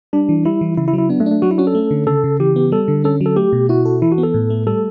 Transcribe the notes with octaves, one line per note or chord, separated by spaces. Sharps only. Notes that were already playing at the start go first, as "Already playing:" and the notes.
G3 D4
E3
G3 E4
E3
C#3 E4
E4
F#3
E4
B3 D4
A3
D4
A3
F#3 F#4
E4
C#4 F#4
A4
A3
D3
C#3 A4
C#3
E3 G4
B3
G3 A4
D3
C#4 A4
F#3
A4
A3 G4
B2
E4 F#4
A4
E3 E4
F#4
B3
A4
A2
A3
G3 A4